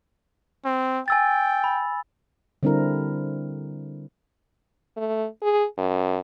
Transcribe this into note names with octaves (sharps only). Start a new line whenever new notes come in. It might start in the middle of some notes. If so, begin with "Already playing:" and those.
C4
G5 G#5 E6 A6
B5
D3 G3 C4 D4 E4 A#4
A3
G#4
F#2